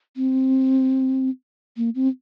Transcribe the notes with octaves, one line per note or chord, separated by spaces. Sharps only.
C4
A#3
C4